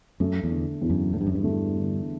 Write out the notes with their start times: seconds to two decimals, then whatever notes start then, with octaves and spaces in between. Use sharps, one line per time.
0.20 F#2 A3
0.44 E2
0.51 D3
0.82 E2
0.90 F#2
1.13 A2 D4
1.21 G2
1.27 F#2
1.35 G2
1.44 A3
1.75 D3